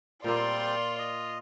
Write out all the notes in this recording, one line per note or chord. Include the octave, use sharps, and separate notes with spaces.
A#2 G3 A#3 C4 F4 D5 G5 C6
D#5